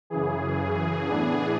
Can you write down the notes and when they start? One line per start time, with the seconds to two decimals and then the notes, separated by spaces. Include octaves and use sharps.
0.10 F#2 C#3 E3 G#4
1.06 A2 E3 B3 D4